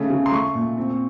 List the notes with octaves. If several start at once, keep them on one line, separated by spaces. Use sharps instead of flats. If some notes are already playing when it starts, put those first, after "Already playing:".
Already playing: C#3 A3
C#3
C6
A3 C#6
A#2
C4